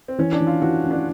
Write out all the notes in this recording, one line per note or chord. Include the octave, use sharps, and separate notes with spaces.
C4
E3 C#4
D4
E3
F4
E3 F#4
C#4
D4